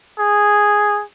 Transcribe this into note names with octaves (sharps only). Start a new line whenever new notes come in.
G#4